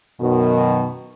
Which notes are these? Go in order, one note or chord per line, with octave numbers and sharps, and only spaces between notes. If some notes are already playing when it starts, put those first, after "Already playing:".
F#2 B2 D#3